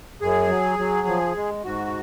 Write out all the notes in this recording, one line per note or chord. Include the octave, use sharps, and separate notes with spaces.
F#2 G#4
F#3
F#3
F3
G#3
G#2 F#4